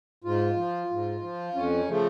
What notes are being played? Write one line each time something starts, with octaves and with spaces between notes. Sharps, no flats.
G#2 F4
F3
G#2
F3
F2 C#4
C#3 F3 A3